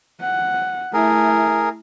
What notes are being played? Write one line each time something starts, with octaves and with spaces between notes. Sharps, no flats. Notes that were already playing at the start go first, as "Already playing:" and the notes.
F#5
A3 E4 G#4 A#4